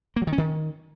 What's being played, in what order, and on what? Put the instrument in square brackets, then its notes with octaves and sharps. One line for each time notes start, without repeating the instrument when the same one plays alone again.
[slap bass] A#3
F#3
D#3
C#4
D#3